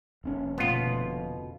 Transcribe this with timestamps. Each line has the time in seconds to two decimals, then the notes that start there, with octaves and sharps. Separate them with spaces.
0.24 F1 C4 C#4
0.58 D2 B2 B3 F4